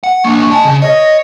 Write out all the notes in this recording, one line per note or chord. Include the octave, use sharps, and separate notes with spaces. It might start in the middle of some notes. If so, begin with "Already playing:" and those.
F#5
A#3 D4 C#6
D#5 G#5 A5
C#3
C#5 D#5